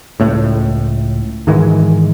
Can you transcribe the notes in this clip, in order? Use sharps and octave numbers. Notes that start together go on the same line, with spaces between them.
C#2 A2
G#2 D#3 E3 G#3